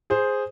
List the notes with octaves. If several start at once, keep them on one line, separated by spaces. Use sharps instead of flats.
G#4 C5